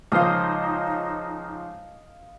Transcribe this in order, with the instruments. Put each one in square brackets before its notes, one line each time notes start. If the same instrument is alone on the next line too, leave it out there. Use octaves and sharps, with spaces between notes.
[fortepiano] C#2 F3 C5 [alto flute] D#4 [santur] D#5 F5